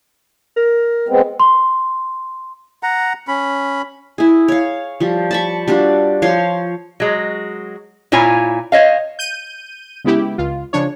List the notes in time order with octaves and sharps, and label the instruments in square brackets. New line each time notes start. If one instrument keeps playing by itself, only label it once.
[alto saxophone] A#4
[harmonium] G#3 B3 C4
[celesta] C6
[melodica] F#5 A#5
C#4 B5
[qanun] E4 G#4
C#5 F5
F3 G3
A5 B5 C#6
G3 D4 F4 F#4
F3 C#5 F5 C6
[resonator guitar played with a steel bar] F#3 G#3
A#2 E4 F4 C#5 G#5 A#5
C5 C#5 D#5 F5
[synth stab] G6 D#7
C#3 G#3 B3 E4 G4
C#2 F4
C#3 F3 D4 C#5